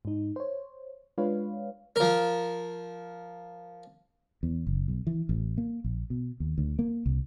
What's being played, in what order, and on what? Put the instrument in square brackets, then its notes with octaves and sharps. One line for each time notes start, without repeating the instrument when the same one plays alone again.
[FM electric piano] G#2 D#4
C5 C#5
G#3 D4 F4 B4 C#5 F5
[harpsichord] F3 A#4
[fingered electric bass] E2
F#1
B1
E3
A1
A#3
A#1
B2
D#2
D2
A#3
C2